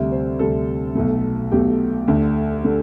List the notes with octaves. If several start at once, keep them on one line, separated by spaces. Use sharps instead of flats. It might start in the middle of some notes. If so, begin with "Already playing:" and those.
Already playing: D2 C3 G3 E5
C5
D2 C3 G3 A4
B1 B2 A3
B1 B2 A3 G4
D2 D3 A3
D3 A3